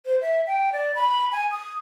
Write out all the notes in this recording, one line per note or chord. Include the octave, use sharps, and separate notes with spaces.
C5
E5
G5
D5
B5
G#5
D#6